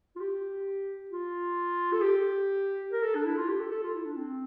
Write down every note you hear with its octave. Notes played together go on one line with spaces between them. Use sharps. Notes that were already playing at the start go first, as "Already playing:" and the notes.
F4
G4
F4
A4
G4
A#4
A4
D4
E4
F4
G4
A4
A4
F4
E4
D4
C4